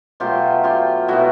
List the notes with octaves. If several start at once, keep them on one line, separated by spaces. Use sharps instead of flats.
B2 F#3 A3 F4 G4
F4 G4
B2 F#3 A3 E4 F#4